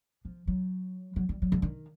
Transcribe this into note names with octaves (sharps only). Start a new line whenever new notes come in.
F3
F#3
F#3
G3
F#3
D3
D#3